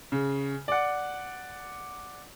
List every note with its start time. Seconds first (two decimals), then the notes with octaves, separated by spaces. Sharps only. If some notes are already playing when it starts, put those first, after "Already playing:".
0.12 C#3
0.68 D5 F#5